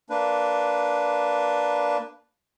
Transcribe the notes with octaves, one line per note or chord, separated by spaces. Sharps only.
A#3 D4 B4